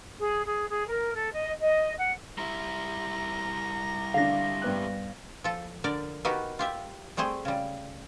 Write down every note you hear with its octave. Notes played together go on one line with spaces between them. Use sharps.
G#4
G#4
G#4
A#4
A4
D#5
D#5
F#5
G3 E4 A#5
D3 D4 F5 A#6
G2 B3 F#6
F3 A4
D3 A#4 D5
B3 D#4 F#4 G4 A#4 B4
F4 G4 E5
G3 A3 C4 G#4 C5
C#3 G3